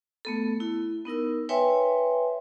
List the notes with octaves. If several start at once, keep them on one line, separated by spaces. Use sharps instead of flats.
A3 B3 A4
E4
B3 D#4 A#4 E6
B4 C#5 E5 G5 G#5 C6